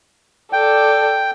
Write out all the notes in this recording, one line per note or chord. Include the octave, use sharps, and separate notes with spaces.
A4 D5 G5